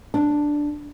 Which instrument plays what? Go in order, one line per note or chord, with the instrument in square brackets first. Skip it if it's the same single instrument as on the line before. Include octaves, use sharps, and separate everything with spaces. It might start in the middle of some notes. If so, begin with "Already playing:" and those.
[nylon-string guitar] D4